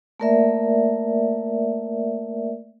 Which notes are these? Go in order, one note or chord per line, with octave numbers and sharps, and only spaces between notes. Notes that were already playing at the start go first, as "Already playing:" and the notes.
A3 A#3 A#4 D5 E5